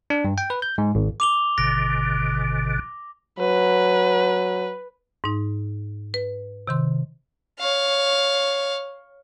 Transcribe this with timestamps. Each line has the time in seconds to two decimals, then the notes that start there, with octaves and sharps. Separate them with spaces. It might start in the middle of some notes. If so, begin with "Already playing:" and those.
0.10 D4
0.25 G2
0.38 G5
0.50 B4
0.62 G6
0.78 G#2
0.95 G#1
1.20 D6 F7 G7
1.58 G#1 B2 D3 A#6
3.39 F#3 B4
5.24 G#2 D#4
6.14 B4
6.67 C3 D#3 C6
7.59 C#5 F5